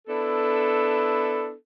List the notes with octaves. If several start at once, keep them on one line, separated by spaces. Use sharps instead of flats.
B3 D4 E4 A4